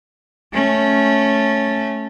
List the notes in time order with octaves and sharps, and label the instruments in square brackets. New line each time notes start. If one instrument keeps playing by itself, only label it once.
[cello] A3 C#4